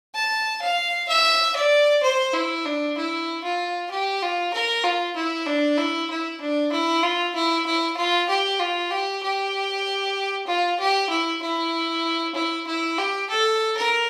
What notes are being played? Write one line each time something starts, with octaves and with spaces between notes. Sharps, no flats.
A5
F5
E5
D5
C5
E4
D4
E4
F4
G4
F4
A#4
F4
E4
D4
E4
E4
D4
E4
F4
E4
E4
F4
G4
F4
G4
G4
F4
G4
E4
E4
E4
E4
G4
A4
A#4